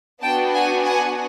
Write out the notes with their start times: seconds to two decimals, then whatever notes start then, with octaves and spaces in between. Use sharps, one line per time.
0.22 B3 D4 F#4 G5 A5
0.54 F#5 G#5
0.85 F#5 G#5